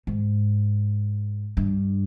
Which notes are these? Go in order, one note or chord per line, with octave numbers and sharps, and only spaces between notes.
G#2
G2